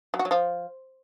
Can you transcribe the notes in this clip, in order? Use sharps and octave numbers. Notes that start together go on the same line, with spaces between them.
F#3
F#4
F#3
F3